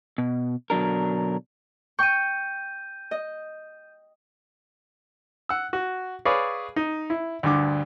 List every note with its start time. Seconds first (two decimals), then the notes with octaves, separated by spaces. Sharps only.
0.18 B2
0.70 B2 D3 F#3 D4 A#4
1.99 G5 C#6 G6 D#7
3.11 D#5
5.49 F#5 E6
5.73 F#4
6.25 G#4 B4 C#5 D5 F5
6.76 D#4
7.10 E4
7.43 D2 G2 D3 D6